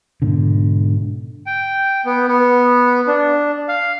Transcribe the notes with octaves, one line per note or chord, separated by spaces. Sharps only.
G#2 B2 D3
G5
B3
B3
D4
F5